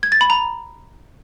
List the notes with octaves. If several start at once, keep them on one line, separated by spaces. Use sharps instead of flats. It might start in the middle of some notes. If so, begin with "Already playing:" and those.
G#6
A6
B5
A#5